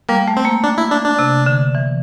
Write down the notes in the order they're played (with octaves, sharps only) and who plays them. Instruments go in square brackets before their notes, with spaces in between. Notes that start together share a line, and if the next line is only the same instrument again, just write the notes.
[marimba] G3 [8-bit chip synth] A#3
[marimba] A3
[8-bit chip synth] C4
[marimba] A#3
[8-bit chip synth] D4
E4
D4
D4
[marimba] C3
D3
E3